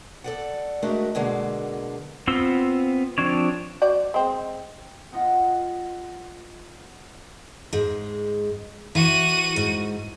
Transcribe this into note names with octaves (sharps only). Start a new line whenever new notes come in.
A4 D5 F#5
G#3 A3 D4 F#4 A#4 E5
B2 D3 G#3 A#3
B3 C4 F4 C6 E6
F3 C4 D4 C#5
F#4 C5 D5
G#3 C4
F4 D#5 F#5
G#2 G#3
E3 F#4 D#7
G#2